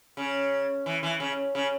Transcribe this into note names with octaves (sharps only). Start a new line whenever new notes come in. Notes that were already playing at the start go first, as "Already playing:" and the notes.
C#3
E3
E3
C#3
C#3